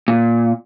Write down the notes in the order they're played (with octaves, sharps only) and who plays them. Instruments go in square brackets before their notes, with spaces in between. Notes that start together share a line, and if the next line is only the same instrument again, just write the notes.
[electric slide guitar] A#2